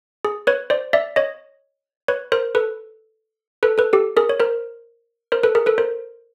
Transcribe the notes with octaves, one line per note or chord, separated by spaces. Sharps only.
G#4
B4 C#5
C5 D5
D5 E5
C#5 D#5
B4 C#5
A#4 C5
A4 B4
A4 B4
A4 B4
G4 A4
G#4 A#4
C#5
A#4 C5
A#4 C5
A4 B4
G#4 A#4
A4 B4
A#4 C5